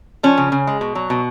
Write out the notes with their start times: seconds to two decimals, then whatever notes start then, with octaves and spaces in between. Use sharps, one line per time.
0.23 F3 C#4
0.38 C#3
0.52 C#3
0.67 G#3
0.81 B2
0.95 F#3
1.10 B2